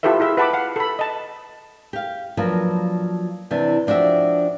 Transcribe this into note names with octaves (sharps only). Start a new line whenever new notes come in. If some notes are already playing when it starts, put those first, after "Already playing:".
E4 F4 G4 A4 B4 E5
E4 G#4 E5 F5
B4 F#5 A5 B5 D6
F5 F#5
A4 B5
D#5 A5
G4 F5
F3 F#3 A#3 D4 A#4 B4
C3 E3 D4
F3 D4 F#4 G4 E5